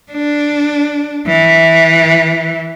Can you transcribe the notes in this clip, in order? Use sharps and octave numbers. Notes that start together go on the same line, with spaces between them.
D4
E3